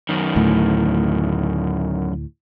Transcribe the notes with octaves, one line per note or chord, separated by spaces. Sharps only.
F#2 D#3
D2 A2